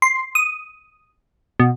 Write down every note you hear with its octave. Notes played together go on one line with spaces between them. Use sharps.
C6
D#6
B2